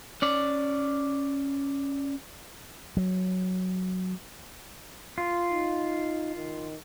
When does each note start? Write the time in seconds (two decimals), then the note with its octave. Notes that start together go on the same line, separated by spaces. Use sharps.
0.22 C#4 D5
2.97 F#3
5.18 F4
5.51 D#4
6.36 D#3